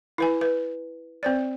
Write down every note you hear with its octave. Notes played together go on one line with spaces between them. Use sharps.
E4 B4 G#5
B4
C4 C5 D5